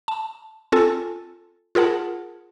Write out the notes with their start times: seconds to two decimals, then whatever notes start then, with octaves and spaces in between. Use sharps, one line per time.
0.08 A5
0.72 C4 F4 A4 G#5 A5
1.75 F4 G#4 A#4 F#5 A5